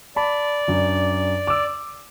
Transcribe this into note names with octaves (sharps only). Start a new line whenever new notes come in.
D5 A5 B5
F#2 D4
D6 E6